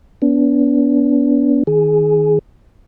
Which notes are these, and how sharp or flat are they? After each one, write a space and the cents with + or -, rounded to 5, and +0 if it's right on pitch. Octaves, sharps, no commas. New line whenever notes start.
B3 -15 D4 -40
D#3 +10 G#4 +10